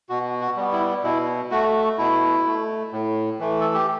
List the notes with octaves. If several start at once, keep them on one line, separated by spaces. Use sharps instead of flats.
B2 F#4
F#4
G3 B3
E4
B2 E4
A3 F#4
B2 E4
A3
A2
E3 A3
A4
G4